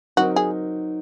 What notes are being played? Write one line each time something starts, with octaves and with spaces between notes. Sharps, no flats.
F#3 C4 D#4 F#4 A#4
G#4